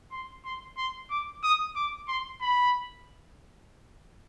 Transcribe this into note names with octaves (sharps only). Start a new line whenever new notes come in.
C6
C6
C6
D6
D#6
D6
C6
B5